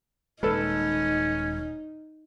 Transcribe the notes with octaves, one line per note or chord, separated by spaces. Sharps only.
D#1 G#3 C#4 D#4 A4 B4